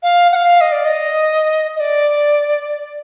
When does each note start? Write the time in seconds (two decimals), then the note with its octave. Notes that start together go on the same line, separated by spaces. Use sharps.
0.03 F5
0.32 F#5
0.36 F5
0.61 D#5
0.72 D5
0.85 D#5
1.76 D#5
1.80 D5